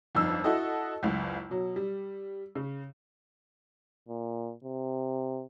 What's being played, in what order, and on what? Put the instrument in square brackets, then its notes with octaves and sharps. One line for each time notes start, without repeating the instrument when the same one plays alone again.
[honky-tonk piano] G1 F2 D#4 E6
E4 F#4 A4 D#5
F#1 C#2
B2 F#3
G3
C#3
[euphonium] A#2
C3